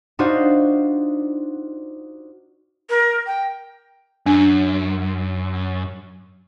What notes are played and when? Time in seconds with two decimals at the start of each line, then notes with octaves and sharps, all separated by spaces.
0.19 D4 D#4 F4 F#4 C5
2.90 A#4
3.26 G5
4.26 F#2 D4